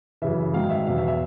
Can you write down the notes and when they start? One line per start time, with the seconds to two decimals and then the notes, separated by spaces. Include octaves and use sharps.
0.22 F#2 C#3 E3 E5
0.54 G#2 D#3 F#3 F5
0.70 E5
0.86 E2 B2 F#3 F5
0.98 E5
1.08 E5